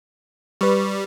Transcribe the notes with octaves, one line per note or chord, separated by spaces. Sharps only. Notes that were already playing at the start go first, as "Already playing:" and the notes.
G3 B4 C#6